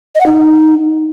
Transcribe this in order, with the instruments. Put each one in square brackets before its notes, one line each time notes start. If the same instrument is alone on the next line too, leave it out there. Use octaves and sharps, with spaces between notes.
[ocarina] D#5
F#5
D#4